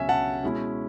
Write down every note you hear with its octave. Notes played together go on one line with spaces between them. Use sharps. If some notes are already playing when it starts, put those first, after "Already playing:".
Already playing: C#2 B2 F#3 C#4 E5 G#5
F#5 A5
B2 G#3 C#4 E4